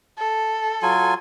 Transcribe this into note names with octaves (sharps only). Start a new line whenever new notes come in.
A4
F#3 F4 G#5